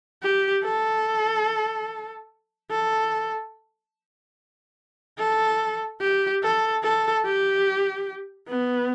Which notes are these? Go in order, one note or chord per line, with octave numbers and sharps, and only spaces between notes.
G4
A4
A4
A4
G4
A4
A4
G4
B3